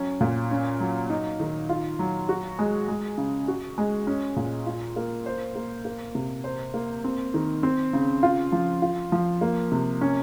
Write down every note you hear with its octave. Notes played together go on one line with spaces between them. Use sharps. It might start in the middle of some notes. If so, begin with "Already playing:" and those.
Already playing: F#3 C#4
A#2
C#4
F#3
D#4
D#3
F4
F#3
F#4
G#3
G#3
C#3
F#4
G#3
C#4
A#2
F4
A#3
C5
A#3
A#3
C3
C5
A#3
C4
D#3
C4
C#3
F4
F3
F4
F3
A#3
C3
C#4